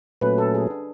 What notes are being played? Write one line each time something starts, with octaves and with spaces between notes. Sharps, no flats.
A#2 F#3 A3 C#4 B4
A4
G#4
D4